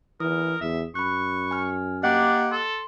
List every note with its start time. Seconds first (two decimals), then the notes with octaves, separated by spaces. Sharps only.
0.20 E3 A#4 D#6
0.61 E2 E5
0.95 F#2 B5 C#6 F#6
1.51 G#5 F6
2.03 A#3 D4 G4 D#5 F#5
2.52 A4 C6